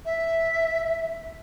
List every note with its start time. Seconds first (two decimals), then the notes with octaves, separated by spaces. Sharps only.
0.05 E5